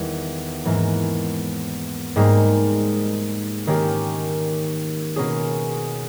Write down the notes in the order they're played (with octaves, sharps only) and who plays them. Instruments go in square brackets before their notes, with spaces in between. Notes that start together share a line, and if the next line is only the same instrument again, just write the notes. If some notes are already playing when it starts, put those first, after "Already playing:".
Already playing: [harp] E2 D#3 G3
G#2 E3 A#3 C#4
G#2 G3 A#3 D#4 G#4
D#3 A#3 C#4 G4
B2 A#3 C#4 G#4